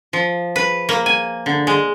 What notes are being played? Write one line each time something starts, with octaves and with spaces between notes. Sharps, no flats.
F3
B4
A#3
G#5
D3
G#3